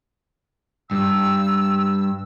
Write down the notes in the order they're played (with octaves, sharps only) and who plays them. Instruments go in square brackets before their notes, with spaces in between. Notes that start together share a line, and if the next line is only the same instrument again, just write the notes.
[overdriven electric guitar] G2 [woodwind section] E6